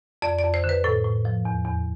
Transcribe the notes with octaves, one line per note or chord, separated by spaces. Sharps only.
F2 D5
D5
F2
C5
D3
B4
A2 A4
A2
F3
E2
E2